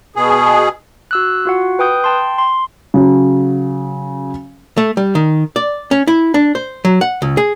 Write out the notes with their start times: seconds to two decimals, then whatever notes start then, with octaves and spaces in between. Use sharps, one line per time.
0.16 B2 G#4
1.11 F#4 E6 F#6
1.45 F4 F#4 F#5
1.79 B4 G5 D#6 G6
2.04 G5 A5 C6
2.38 C6
2.94 C#3 F#3
4.77 A3
4.97 G3
5.15 D#3
5.56 D5
5.91 C#4
6.07 E4
6.34 D4
6.55 C5
6.85 F#3
7.01 F#5
7.22 C#2
7.37 G#4